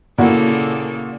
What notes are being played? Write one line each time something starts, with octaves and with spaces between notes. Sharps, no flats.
A#2 C#3 A#3 E4 F#4 A4